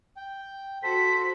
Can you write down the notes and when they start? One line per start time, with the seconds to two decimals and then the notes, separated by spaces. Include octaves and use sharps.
0.17 G5
0.83 F#4 A4 C5 B6